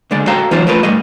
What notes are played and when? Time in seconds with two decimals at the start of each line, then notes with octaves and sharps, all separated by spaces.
0.11 C#2 D3 G#3 D5
0.27 F#4 A4 C5 F5 G5 A#5
0.51 E3 F#3 D#4 F4 C5 D5
0.67 F3 A3 F4 A#4 B4
0.83 G#2 G3 A3 D#5